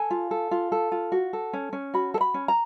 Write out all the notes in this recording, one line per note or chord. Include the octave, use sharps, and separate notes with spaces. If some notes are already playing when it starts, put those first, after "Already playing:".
Already playing: A4 G#5
F4
A4
F4
A4
F4
F#4
A4
C#4
C#4
F#4 B5
A4
B5
C#4
A#5